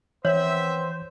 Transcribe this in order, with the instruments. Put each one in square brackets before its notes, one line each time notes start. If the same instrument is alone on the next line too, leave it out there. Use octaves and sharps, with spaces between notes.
[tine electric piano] E3 [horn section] B3 C4 E5 [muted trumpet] C5 [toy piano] C#5